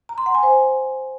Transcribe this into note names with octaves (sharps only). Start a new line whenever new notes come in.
A#5
C6
F#5
G#5
C5